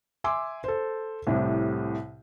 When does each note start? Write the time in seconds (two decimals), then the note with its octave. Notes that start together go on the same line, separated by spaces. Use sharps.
0.24 E5 G#5 C6 D6 E6
0.64 A4 C5
1.27 C2 A2 C3